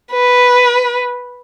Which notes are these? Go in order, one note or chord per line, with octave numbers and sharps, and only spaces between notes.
B4